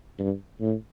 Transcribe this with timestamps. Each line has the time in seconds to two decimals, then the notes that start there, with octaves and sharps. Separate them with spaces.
0.19 G2
0.61 A2